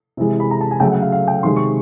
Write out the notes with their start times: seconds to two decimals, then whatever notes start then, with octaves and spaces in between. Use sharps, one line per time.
0.17 C3 E3 G#3
0.40 B5
0.51 A#5
0.61 A5
0.71 G#5
0.80 C#3 F#3 A3 G5
0.91 F#5
1.02 F5
1.12 F5
1.28 G5
1.43 C3 D#3 G#3 C6
1.56 C#6